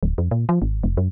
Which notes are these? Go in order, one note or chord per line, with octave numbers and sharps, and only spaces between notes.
D1
F2
A#2
F3
G#1
F1
F#2